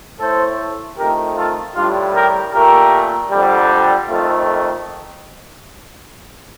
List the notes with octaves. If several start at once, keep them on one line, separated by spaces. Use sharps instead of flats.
A2 A3 A4 C5
F2 D#3 A3 G4 A#4
F4 A4
A2 G3 D4 F4
G4 A#4
A#2 A3 G4 A#4
F2 D3 G3
F2 D#3 A3 F4 A4